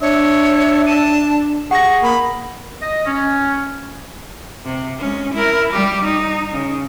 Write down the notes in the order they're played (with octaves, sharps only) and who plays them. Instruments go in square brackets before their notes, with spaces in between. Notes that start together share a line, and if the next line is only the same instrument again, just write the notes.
[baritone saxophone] D4 [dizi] C#5 [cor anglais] E5
[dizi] A5 [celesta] D#7
[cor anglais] G#4 [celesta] F#5 A#6 [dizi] C#6
[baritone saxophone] A#3 [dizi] B5
[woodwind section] D#5
C#4
[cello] C3
G#3 C#4
E4 A#4
G3 G4
D#4
C#3